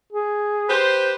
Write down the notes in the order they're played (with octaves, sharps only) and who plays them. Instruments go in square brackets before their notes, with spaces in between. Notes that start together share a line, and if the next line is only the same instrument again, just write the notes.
[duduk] G#4
[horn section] G4 B4 C5